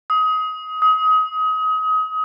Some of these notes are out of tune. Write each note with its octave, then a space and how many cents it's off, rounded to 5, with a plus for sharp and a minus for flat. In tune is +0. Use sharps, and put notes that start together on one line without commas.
D#6 +25
D#6 +30